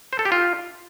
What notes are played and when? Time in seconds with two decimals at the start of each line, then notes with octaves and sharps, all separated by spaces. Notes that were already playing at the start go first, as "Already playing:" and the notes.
0.13 C5
0.19 A4
0.25 G4
0.32 F4